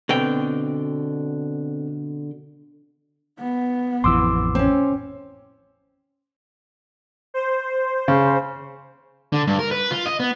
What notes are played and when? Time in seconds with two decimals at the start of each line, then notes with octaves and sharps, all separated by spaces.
0.09 B2 D3 C4 A4 G5
3.39 B3
4.04 A1 F2 E3 C6 D6 E6
4.55 C4 C#4
7.34 C5
8.08 C#3
9.32 D3
9.47 G2
9.59 A#4
9.71 B4
9.91 F4
10.06 D#5
10.20 B3